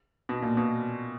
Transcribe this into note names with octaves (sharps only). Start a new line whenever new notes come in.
B2
A#2
B2